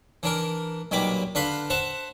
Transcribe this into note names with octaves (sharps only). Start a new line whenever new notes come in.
E3 D4 A#4
B1 A#2 G3 B5 D6
D3 D4 B4 F5 B5 C6
C5 E5 F#5 A5